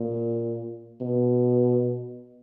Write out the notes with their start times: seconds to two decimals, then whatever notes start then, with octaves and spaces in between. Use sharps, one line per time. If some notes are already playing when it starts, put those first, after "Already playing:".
Already playing: A#2
1.01 B2